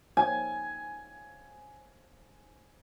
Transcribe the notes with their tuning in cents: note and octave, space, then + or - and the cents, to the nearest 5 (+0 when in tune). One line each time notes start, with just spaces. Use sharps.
G#5 +10